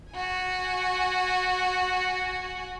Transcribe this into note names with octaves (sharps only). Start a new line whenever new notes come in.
F#4 G#5